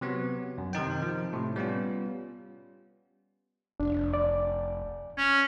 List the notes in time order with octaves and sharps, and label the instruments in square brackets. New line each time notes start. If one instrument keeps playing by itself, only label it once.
[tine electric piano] C3 F#3 B3
F#2
C3 D#3 D#4 G5
F3
A2 C3
G3 B3 C#4 F4
[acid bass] F1 [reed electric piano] D4
[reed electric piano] D5
[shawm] C#4